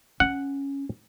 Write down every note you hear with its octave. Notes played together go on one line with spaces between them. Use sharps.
C#4 F#5